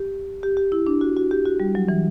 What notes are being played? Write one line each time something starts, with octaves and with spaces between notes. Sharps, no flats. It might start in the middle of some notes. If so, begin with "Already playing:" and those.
Already playing: G4
G4
G4
E4
D4
F#4
F#4
G4
F#4
G3
F#3
E3